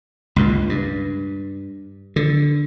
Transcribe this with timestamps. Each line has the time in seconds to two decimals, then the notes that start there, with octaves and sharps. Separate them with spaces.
0.36 C#2 G2 A#2
0.69 G2
2.16 D3